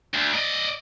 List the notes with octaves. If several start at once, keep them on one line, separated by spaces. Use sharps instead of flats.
D2
D5 D#5